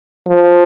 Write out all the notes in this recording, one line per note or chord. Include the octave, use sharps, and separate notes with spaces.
F3